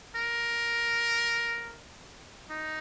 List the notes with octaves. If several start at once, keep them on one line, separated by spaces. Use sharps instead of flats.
A#4
D#4